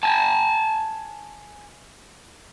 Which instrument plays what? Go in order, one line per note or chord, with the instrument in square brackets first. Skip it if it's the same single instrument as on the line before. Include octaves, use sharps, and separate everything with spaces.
[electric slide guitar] G#5 A5